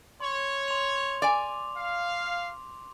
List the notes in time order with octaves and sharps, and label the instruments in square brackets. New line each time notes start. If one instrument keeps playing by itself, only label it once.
[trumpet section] C#5 [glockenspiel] C6
[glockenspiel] C6 F7
[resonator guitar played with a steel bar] D5 G#5 [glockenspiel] D6
[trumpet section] F5